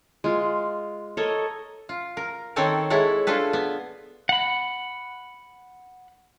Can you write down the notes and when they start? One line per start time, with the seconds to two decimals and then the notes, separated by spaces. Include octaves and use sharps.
0.24 G#3 F4
1.17 A4 A#4 C#5 D#5
1.89 F4
2.17 A#4
2.56 D#3 C4 A4 C#5 F#5 G#5
2.90 G#3 E4 A4 C#5 F#5
3.27 D4 F4 G#4 A4 B4
3.53 B3
4.29 F#5 B5